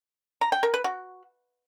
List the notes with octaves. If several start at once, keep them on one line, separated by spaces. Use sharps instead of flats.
A#5
G5
A#4
B4
F#4